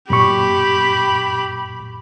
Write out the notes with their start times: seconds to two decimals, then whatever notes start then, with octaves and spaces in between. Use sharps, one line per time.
0.10 F#2 A#2 G4 B5 C#6